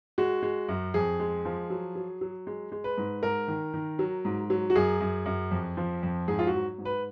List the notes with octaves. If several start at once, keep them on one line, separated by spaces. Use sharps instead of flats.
G#3 F#4
G#3
F#2
F2 G#4
G#3
F3
F#3
F#3
F#3
G#3
G#3
B4
G#2
G#2 A#4
D#3
D#3
F#3
G#2
F#3
F#4
F#2 G#4
F#2
F#2
F2
F3
F2
G#2 G#4
F4
F#4
F#3
G#2
B4